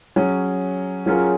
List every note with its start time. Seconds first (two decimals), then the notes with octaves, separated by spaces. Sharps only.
0.16 F#3 C#4 G#4
1.06 F#3 C#4 F4 G#4 A#4